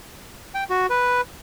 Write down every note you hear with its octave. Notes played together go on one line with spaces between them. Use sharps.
G5
F#4
B4